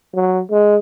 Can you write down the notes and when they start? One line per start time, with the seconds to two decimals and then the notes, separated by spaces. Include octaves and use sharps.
0.15 F#3
0.51 G#3